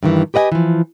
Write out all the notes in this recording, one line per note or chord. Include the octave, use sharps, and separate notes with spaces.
G2 D#3 E3
G4 B4 D#5 F#5 G#5
E3 F3